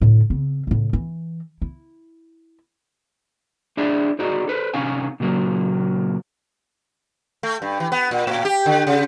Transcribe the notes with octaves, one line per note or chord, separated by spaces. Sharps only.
A2 D3
C#3 C4
A2 C#3
E3
E4
D4 E4 G#4 D5 E5
D#4 F#4 G#4 D5 D#5 A#5
A4 B4 C5
C3 C#4 D#4 F5 G#5
A#2 C#3 F#3 A#3
A3
G2
E3
B3
A#2
A2
G4
D3
C#3